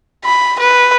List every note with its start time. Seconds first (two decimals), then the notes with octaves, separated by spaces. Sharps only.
0.25 B5
0.59 B4